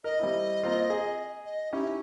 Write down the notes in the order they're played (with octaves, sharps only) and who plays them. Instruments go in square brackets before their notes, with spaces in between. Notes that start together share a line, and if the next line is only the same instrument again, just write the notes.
[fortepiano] A#4 [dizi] D#5
[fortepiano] G3 C4 E4
A#3 C4 F4
G#4
[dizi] D#5
[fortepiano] C#4 E4 G4 [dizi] D#4